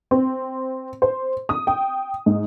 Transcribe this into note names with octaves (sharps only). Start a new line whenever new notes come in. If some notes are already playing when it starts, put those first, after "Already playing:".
C4
C5
D#6
G5
G#2